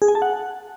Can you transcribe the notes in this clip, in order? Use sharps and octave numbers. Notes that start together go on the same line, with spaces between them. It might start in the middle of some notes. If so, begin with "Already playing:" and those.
G#4
G#5
A5
F#5